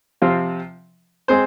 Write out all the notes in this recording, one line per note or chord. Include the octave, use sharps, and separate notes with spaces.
C3 F3 C4 F4
G#3 C4 G#4 C5